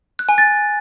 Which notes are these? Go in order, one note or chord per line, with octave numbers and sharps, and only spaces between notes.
F#6
G#5
A6